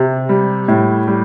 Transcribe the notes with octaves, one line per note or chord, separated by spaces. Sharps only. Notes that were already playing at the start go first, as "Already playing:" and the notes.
Already playing: C3
G3
A2
G3